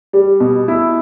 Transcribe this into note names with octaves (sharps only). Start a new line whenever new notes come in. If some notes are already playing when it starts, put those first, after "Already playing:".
G3
B2
E4